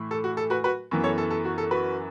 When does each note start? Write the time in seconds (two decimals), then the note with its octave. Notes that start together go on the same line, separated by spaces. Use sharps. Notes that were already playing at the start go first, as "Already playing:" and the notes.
Already playing: A2 E3
0.11 A4
0.24 F#4
0.37 A4
0.50 F#4 B4
0.64 F#4 B4
0.91 F#2 E3 B3
1.04 A4 C#5
1.18 A4
1.31 A4
1.45 F#4
1.58 A4
1.71 F#4 B4